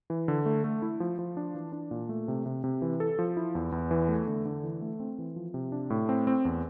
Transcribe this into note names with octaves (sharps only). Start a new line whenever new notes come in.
E3
D3
A3
A3
E4
F3
F3
D4
E3
D4
A#2
A3
C3
C3
C3
E3
A4
F3
E4
E2
E2
E3
A3
D3
D3
E3
A3
C4
E3
F3
C3
D4
A2
C4
C4
E2